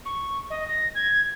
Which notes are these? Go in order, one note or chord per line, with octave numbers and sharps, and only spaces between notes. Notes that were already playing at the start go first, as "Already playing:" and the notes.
C#6
D#5
A#6
G#6